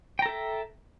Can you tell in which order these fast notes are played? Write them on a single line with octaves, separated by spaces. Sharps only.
G5 A#5 A4 E5